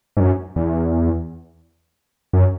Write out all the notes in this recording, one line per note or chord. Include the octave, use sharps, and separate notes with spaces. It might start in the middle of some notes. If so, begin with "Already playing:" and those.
G#2
F#2
E2
F#2